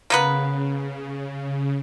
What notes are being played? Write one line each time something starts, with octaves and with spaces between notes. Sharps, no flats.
C#3 A#3 B3 B4